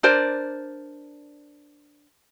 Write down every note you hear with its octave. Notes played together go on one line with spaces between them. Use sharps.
D4 A#4 C5 D5